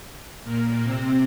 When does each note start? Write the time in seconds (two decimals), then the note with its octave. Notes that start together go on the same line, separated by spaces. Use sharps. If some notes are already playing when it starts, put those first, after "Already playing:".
0.44 A#2 A#3
0.84 C3 C4